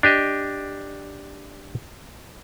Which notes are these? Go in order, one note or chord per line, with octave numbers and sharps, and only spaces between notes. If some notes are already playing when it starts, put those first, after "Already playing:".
D4 G4 D#5